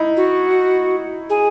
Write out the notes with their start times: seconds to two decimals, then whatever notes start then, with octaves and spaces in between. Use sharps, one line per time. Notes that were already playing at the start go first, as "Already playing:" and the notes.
Already playing: D#4 E4
0.17 F#4
1.30 G#4